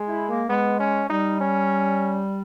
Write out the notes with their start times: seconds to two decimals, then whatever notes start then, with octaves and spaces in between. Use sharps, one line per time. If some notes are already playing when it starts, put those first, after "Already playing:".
Already playing: G#3
0.08 E4
0.29 A#3
0.49 G#3 B3
0.80 C#4
1.09 G3 D#4
1.41 C#4